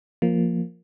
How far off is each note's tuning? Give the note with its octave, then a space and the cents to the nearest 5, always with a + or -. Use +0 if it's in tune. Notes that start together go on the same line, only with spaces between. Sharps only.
F3 +0 A#3 +0